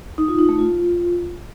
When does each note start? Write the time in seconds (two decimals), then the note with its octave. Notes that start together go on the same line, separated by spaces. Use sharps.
0.18 D#4
0.28 F4
0.39 D#4
0.49 A3
0.59 F4